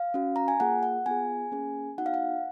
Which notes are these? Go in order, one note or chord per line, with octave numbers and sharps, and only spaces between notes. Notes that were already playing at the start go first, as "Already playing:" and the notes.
Already playing: F5
C#4 F#4
A#5
G#5
A#3 F4 G#4 F#5
F#5
B3 F4 G#4 G#5
A#3 C#4 G#4
B3 D#4 F#4 F#5
F5
F#5